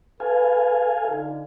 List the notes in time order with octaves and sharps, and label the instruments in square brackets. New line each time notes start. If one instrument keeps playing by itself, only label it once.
[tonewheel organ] A4 F5 G#5 [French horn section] B4
[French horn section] D3 D#4 F4